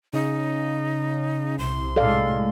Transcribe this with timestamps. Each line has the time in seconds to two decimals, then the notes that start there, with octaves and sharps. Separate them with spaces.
0.13 C#3 D#4
1.59 C2 C3 C6
1.96 A2 C3 G#3 A4 D5 F5